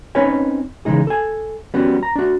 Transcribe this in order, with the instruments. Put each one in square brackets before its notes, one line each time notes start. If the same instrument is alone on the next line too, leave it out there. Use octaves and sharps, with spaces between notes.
[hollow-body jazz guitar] C4 C#4 D#4 B4 C#5 G#5
C#3 E3 G#3 D#4 G#4
A4 G#5
G3 B3 C#4 F#4
A#5
D4 F#4